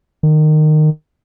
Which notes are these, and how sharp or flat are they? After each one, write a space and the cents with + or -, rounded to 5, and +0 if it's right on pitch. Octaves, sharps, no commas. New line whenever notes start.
D#3 -20